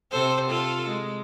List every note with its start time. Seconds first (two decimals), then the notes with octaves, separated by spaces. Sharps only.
0.11 C3 A4 C5
0.49 F4 A4
0.89 G#3